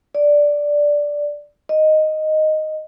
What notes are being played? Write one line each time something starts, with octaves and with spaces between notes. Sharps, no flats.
D5
D#5